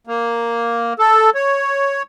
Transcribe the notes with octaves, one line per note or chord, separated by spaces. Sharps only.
A#3
A4
C#5